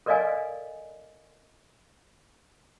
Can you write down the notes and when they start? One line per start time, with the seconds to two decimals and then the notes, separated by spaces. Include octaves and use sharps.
0.06 A4 A#4 D5 D#5 F5 G#5